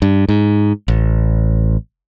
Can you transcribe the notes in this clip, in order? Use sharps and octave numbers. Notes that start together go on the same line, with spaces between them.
G2
G#2
A1